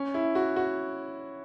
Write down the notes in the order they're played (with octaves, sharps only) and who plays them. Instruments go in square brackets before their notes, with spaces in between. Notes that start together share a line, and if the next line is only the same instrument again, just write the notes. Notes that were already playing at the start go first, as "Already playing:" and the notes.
Already playing: [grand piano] C#4
E4
F#4
F#4